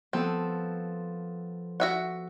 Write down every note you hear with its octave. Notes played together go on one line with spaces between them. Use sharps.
F3 B3 C4 A4
F#4 E5 F#5